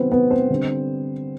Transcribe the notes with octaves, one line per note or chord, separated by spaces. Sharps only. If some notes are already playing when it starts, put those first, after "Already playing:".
Already playing: C3 D#3 F#3 B3 C4 B4 C5
B3 B4
C4 C5
D3 G3